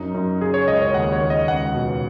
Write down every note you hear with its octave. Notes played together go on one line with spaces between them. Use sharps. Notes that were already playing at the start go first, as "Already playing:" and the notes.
Already playing: F#2 D#4
F#2
C#3 G#4
C#5
C#2 D#5
C#5
D#2 F#5
C#5
D#2
D#5
C#2 F#5
B2